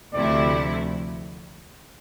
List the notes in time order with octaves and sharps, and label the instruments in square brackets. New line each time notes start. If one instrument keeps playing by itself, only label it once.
[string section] D2 C3 F3 A3 E4 [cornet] D5